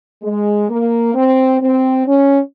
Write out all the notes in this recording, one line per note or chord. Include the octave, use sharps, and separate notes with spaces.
G#3
A#3
C4
C4
C#4